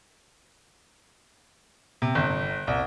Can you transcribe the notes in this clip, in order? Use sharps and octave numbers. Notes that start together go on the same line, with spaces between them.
C3
G1
C2